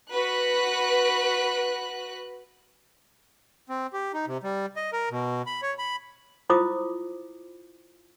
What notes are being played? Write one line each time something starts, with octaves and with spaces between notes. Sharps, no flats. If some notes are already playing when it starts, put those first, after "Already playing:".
F#4 B4 F#6
C4
G4
D#4
C3
G3
D#5
A#4
B2
B5
C#5
B5
E4 F4 C5 D6 D#6